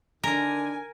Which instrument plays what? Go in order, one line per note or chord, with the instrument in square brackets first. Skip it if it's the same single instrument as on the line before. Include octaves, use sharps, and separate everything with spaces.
[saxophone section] D3 D#3 D4 [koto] A#4 [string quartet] G#5